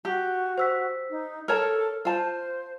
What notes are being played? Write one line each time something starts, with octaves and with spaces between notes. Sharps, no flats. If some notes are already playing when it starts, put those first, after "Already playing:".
F#4 G4
C5 E6 B6
D#4
A4 A#4 C#5 A5 F6
F4 C5 A5